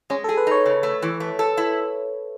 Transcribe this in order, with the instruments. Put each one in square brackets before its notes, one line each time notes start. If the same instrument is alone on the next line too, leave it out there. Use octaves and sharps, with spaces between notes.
[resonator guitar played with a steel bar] G#3 [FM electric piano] C#4
[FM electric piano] A4
[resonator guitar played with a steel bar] G#4
[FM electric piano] B4
[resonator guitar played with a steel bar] D#4 [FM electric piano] C#5
[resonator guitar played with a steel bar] C#3
A3
E3
A3
A4
E4